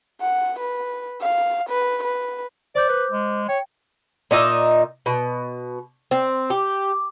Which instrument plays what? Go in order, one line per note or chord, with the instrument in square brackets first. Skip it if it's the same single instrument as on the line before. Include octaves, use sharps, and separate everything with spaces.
[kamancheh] F#5
B4
F5
B4
B4
[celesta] C5 D6 G6 [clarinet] D5
[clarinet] B4
G#3
[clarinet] C#5 [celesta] G5
[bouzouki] A#2 D#4 D#5 E5
B2
C4
G4